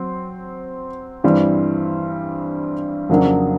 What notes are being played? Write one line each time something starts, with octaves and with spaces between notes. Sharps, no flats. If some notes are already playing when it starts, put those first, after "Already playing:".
Already playing: F#3 C4
G2 E3 G3 C4
F2 C#3 F#3 A#3 D4